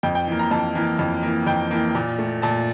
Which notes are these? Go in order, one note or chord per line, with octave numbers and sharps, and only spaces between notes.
F2 G5
G5
E3 A#3
A#5
F2 A5
E3 A#3
F2
E3 A#3
F2 G5
E3 A#3
A#2
A3
A#2 A5